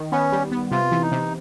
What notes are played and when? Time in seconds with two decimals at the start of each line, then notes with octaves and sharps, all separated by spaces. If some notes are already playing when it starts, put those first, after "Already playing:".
Already playing: D#3
0.12 B3 C#4
0.32 G3
0.52 B3
0.71 C3 F4
0.92 E3
1.02 D#4
1.12 C3